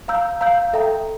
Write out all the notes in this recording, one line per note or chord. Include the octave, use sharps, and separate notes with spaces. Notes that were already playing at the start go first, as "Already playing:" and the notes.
F5 A#5 E6 G6
F5 A#5 E6 G6
A4 E5 G5 A#5